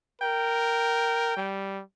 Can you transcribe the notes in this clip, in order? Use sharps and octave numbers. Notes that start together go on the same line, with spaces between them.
A#4 G5
G3